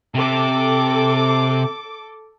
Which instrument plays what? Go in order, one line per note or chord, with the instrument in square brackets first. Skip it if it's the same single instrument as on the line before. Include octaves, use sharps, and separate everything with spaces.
[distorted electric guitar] C3 [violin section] A4 D6